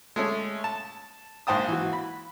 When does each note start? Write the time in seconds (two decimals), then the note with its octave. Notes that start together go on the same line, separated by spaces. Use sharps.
0.16 G#3 A3 C#4 G#4
0.64 A5
1.47 A#1 G#2 C5 G5 A5 D#6
1.68 E3 F#4
1.93 B5